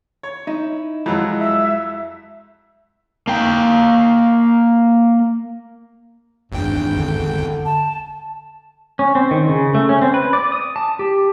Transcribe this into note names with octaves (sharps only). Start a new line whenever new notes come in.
C#5
D#4 E4
F2 E3 F#3 G#3 D#5
E5
A#3 G5
G#1 E2 G2 G5
D3
A5
C#4
C4
D#3
C#3
A3
C#4
C4
B4
D5
D#6
A5
G4